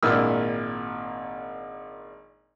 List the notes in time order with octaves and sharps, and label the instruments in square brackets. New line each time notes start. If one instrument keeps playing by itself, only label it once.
[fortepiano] G#1 A#2 D4 E4 E6 F6